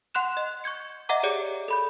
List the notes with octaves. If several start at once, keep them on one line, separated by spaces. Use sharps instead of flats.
F#5 C6 F#6 E7
D#5
C#6 G6 G#6 C#7
D#5 E5 F#5 A#5 D6
G4 G#4 C#5 D5 C#7
A4 B5 G6